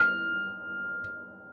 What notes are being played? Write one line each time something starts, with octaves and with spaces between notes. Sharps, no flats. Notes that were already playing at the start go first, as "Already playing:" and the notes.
Already playing: F6